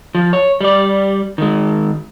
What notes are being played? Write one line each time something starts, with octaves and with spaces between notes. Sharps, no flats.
F3
C#5
G3 D5
D#3 G#3